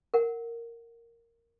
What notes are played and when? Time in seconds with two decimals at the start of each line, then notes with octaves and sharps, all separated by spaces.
0.14 A#4 F#5